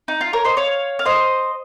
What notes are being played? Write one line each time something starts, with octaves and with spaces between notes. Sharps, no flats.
D#4
F4
A#4 C#5
C5 D#5
C#5 F5
F5
C5 D#5